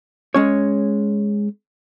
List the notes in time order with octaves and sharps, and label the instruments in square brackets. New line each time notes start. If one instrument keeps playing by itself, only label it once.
[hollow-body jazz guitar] G#3 C#4 C#5